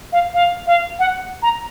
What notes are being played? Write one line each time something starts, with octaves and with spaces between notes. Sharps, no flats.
F5
F5
F5
F#5
A#5